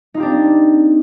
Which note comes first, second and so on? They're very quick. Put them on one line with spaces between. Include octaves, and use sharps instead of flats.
D#4 F4 G4 D4 C4